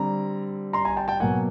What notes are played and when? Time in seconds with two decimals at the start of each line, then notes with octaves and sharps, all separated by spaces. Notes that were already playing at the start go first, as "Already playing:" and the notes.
Already playing: D3 G3 C4 A#5
0.73 A#5 C6
0.85 G#5 A#5
0.97 G5 A5
1.08 G5 A5
1.20 B2 F#3 A#3 F#5 G#5